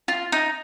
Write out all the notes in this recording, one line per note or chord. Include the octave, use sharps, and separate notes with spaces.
F4
D#4